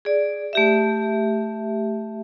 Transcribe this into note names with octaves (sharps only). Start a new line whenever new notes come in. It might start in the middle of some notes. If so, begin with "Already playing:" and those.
G#4 D5
A3 G4 E5